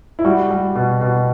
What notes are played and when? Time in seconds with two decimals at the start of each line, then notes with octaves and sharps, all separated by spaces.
0.19 E4
0.25 G3 F#4
0.50 G3
0.75 B2
1.01 B2